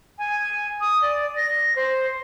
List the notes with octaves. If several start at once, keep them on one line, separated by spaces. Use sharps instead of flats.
G#5
D#6
D5
A#6
C5